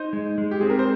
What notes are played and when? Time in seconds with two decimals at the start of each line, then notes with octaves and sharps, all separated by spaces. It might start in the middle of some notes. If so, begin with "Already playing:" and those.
Already playing: D#4 C5
0.13 G#3
0.38 G#3
0.51 G4
0.61 C4 G#4
0.70 A#4
0.79 C5